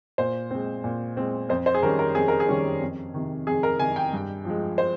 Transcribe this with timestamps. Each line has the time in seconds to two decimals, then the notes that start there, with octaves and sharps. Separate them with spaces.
0.18 A#2 C5
0.51 G#3 C4
0.84 A#2
1.17 G#3 C4
1.49 F2 C5
1.66 C5
1.74 G#4
1.83 D#3 G3 C#4 A#4
1.99 A#4
2.15 F2 G#4
2.28 A#4
2.40 G#4
2.48 D#3 G3 C#4
2.81 F2
3.14 C3 D#3
3.47 F2 G#4
3.63 A#4
3.80 C3 D#3 G#5
3.96 G5
4.13 G2
4.45 F3 G#3
4.78 C5